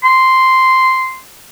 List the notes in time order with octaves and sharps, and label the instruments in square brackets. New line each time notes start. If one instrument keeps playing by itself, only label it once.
[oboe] C6